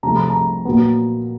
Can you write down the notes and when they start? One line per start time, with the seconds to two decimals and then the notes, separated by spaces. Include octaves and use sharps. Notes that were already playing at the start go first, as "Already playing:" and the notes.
0.03 C2 C3 F3 A3 A#5
0.16 B5
0.30 A#5
0.65 A#2 F#3 B3